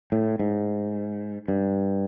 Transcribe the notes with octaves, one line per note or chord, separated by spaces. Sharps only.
A2
G#2
G2